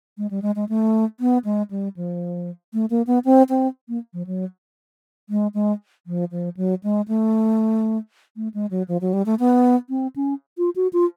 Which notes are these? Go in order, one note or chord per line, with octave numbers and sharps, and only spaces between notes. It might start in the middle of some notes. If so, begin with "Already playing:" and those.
G#3
G3
G#3
G#3
A3
B3
G#3
G3
F3
A3
A#3
B3
C4
C4
A#3
F3
F#3
G#3
G#3
F3
F3
F#3
G#3
A3
A3
G#3
F#3
F3
F#3
G3
A3
B3
C4
C#4
F4
F#4
F4